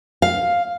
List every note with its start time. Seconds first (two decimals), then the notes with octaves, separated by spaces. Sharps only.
0.22 F5